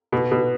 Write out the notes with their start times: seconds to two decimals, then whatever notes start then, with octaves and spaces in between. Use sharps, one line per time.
0.12 B2
0.31 B2